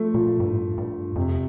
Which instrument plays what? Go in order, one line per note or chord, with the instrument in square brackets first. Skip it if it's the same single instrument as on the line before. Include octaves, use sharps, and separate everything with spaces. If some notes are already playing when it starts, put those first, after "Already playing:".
Already playing: [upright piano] F3 A3
[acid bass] A#2 [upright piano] F3
[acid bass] G2
A2
G2
G2
[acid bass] F2 [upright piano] C3